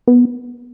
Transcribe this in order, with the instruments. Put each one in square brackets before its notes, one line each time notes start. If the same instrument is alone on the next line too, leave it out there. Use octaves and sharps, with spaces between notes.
[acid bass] B3